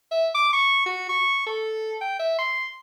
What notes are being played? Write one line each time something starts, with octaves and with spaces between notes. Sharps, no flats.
E5
D6
C#6
F#4
C#6
A4
G5
E5
C6